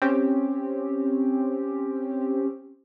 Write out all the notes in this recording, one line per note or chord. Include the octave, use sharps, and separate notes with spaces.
C4 C#4 G4